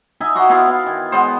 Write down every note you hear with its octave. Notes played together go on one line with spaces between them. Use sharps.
D#4 D#5 E5 G#5
F#4 A#5 C6 D6
B3 D#4 E4 F5
B3
D#3
G#3 B3 C5